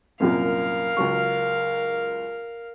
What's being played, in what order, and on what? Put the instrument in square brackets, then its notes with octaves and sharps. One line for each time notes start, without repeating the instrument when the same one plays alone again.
[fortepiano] C2 F#2 A#2 [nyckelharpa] A#4 F5
[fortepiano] C#2 F#3 C#6